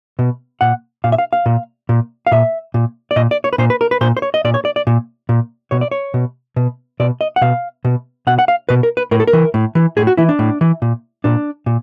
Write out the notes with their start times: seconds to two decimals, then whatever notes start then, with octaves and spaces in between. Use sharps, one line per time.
0.19 B2
0.61 A#2 F#5
1.04 A#2 F5
1.12 E5
1.18 F5
1.33 F5
1.46 A#2
1.89 A#2
2.27 F5
2.31 A#2 E5
2.74 A#2
3.11 D5
3.16 A#2 D#5
3.31 D5
3.44 C#5
3.53 B4
3.58 A#2 C5
3.70 B4
3.81 A#4
3.91 B4
4.01 A#2 C5
4.17 C5
4.22 C#5
4.34 D#5
4.44 A#2 D5
4.54 C#5
4.65 D5
4.76 D5
4.87 A#2
5.29 A#2
5.71 B2 C#5
5.81 D5
5.91 C#5
6.14 B2
6.56 B2
7.00 B2 D5
7.21 D#5
7.36 F#5
7.41 B2 F5
7.85 B2
8.27 B2 F#5
8.39 F#5
8.48 F5
8.69 B2 B4
8.83 A#4
8.97 B4
9.11 A2 A#4
9.20 A4
9.27 A#4
9.33 E3
9.54 A2
9.75 E3
9.97 A2 G#4
10.07 F#4
10.17 E3 E4
10.29 D4
10.39 A2
10.61 E3
10.82 A#2
11.24 A#2 D4
11.66 A#2